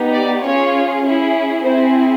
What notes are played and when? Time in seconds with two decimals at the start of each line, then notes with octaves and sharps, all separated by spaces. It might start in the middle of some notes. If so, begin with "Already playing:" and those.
Already playing: B3 D#4 G4
0.13 D5
0.43 C#4 F4 G#4 C#5
1.04 C#4 E4 G#4
1.64 C4 E4 G#4 C5